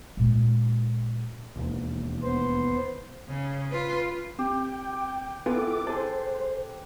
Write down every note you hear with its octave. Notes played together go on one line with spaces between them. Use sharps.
A#2 G#3
E1 D#2
B3 C5
C#3
F4 B4
C4 G4 G5
B3 E4 F4 G#4 A4 B4 D6
G#4 A4 C5